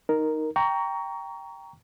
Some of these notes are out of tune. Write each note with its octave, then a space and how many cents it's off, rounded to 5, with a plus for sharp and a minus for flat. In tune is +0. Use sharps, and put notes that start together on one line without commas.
D#4 +0 A#4 +0
G5 +0 A#5 +0 C#6 +25